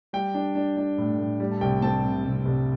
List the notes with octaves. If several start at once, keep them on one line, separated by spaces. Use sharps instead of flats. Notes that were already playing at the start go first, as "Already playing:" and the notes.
G3 G5
D4
D4
D4
A2
A2
G3
A5
C2 G5
C4 A5
C3
C3
C2